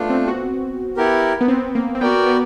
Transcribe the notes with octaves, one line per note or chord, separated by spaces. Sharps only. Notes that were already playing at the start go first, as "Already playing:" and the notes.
Already playing: A3 B3 D4 F4
C4
F#4
B3 E4 G4 A#4
B3
C4
A#3
C4
B3 F#4 A#4 D5 G5
B3